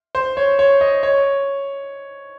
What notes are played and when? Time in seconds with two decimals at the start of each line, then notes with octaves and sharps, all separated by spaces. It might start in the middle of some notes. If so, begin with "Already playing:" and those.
0.15 C5
0.37 C#5
0.59 C#5
0.81 D#5
1.03 C#5